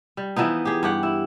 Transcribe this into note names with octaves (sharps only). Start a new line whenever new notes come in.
G3
E3 F3 B3 D#4
G4 G#4
G2 G4 F#5
E4